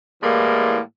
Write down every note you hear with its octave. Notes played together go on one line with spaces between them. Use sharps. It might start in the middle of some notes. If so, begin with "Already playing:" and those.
A2 E3 G3 G#3 A#3